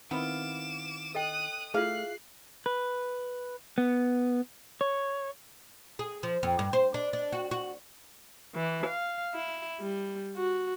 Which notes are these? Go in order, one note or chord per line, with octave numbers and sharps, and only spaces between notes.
D#3 B3 C4 E4 F4 D6 E7
A4 D#5 G5 D#6 F#6
A3 E4 F4 G#4 F5 F#6 C7
B4
B3
C#5
G#4
F3
F2
G2
C5
D4
D4
F#4
F#4
E3
F5
E4
G3
F#4